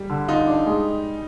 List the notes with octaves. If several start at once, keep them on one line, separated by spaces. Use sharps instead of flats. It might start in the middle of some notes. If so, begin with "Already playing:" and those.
Already playing: G3
D3
D#4 F4
D4
G#3